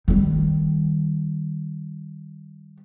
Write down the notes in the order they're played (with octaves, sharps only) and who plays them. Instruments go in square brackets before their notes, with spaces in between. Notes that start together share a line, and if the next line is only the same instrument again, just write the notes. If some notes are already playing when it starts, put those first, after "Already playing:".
[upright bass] D#3 G3